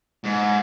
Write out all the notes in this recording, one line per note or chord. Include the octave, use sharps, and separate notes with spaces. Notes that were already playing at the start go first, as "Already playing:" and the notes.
G#2